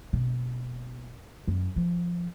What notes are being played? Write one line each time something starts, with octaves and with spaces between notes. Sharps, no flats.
F#1 B2
F#2
F3